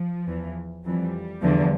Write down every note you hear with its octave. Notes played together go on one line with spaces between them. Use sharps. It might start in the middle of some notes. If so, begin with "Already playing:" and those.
Already playing: F3
E2 E3
F2 E3 G3
E2 D3 F3